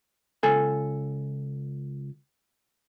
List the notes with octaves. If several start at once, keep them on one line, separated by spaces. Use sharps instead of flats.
C#2 A4 G#5